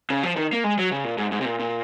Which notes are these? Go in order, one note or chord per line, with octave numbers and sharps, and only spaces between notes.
C#3
F3
D#3
A#3
G#3
F#3
C#3
A#2
G#2
G#2
C3
A#2
A#2